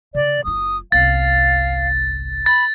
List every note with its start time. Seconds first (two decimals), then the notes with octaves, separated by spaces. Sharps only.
0.15 C#3 D5
0.44 F#1 F4 D#6
0.92 G1 C2 F5 A6
2.46 B5 A6